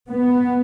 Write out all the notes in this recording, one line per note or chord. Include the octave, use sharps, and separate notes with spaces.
B3